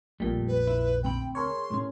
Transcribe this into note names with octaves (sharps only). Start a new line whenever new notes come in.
A#1 F2 A#2 G3 A3 G5
B4
E4
D2 C4 G5 B5
G#4 A#4 C#5 C6
A2 C#4